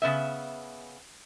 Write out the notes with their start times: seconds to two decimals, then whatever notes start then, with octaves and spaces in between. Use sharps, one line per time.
0.02 C#3 B3 E5